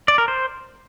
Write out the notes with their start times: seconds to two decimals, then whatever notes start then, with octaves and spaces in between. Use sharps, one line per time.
0.08 D5
0.18 A#4
0.28 C5